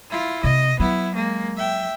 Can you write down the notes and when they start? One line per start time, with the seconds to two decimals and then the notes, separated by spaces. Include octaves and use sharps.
0.10 E4 F4
0.44 C3 D#5
0.80 F#3 B3 E4
1.13 G#3 A#3
1.57 E5 G5